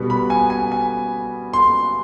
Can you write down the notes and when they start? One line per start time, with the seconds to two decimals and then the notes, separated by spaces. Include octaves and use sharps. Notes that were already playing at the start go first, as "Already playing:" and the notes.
Already playing: B2 G3 B3
0.10 B5
0.30 G#5
0.50 G#5
0.72 G#5
1.53 C6